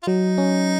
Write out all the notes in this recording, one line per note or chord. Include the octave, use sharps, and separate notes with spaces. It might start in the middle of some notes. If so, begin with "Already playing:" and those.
F4
F#3 D#4
C#4